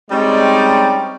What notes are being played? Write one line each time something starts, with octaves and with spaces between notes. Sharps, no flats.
G3 G#3 C4 C#4 D#4 D5